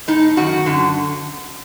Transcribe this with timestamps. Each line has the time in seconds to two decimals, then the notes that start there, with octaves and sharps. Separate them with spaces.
0.08 A2 D#4
0.37 F#2 D#3 F#4
0.66 F#2 D3